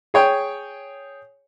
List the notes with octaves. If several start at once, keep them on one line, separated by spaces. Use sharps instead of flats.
G#4 C#5 G5